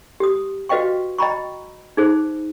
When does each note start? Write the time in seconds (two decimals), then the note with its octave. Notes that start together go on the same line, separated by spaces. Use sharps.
0.20 G4 D#6
0.69 F#4 B4 D#5 F5 G5 C#6
1.18 D#5 G5 A#5 B5 C#6
1.97 D#4 G#4 C5